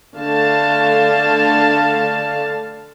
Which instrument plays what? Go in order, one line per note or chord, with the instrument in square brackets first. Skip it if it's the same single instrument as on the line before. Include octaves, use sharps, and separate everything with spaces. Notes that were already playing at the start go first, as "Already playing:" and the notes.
[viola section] D3 A3 F5 A5